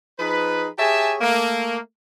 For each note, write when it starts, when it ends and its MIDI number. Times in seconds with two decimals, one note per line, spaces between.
0.20 0.67 53
0.20 0.67 63
0.20 0.67 68
0.20 0.67 71
0.78 1.16 67
0.78 1.16 68
0.78 1.16 73
0.78 1.16 76
0.78 1.16 80
0.78 1.16 81
1.21 1.79 57
1.21 1.79 58